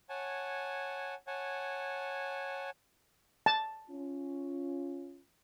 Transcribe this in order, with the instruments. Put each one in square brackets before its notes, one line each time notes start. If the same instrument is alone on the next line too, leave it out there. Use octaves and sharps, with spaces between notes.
[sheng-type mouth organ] C#5 F#5 G#5 A5
C#5 F#5 G#5 A5
[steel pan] A5
[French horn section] C#4 F4